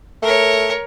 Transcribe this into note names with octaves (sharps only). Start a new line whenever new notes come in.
A3 A#4 C#5